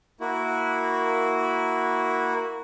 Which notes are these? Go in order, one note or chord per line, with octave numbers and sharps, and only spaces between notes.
A#3 E4 F#4